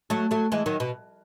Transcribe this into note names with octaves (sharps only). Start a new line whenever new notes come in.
F#3 A3
F#3 A3
E3 G#3
D#3 F#3
B2